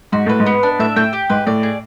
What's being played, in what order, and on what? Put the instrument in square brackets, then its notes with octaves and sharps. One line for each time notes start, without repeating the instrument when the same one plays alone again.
[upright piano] G#2 [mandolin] F#4
[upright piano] A2 [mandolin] B4
[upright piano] G#2
[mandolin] B3
D4
[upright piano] A2 [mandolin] E5
[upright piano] A2 [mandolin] G5
[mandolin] G4
[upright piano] G#2 [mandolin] B4
[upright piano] A2 [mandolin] D5
[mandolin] G#4